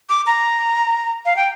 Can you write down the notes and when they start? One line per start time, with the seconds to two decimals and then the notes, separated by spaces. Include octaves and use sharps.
0.09 D6
0.26 A#5
1.25 F5
1.36 G5